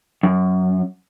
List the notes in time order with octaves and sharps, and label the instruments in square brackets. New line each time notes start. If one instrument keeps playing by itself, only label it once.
[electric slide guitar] F#2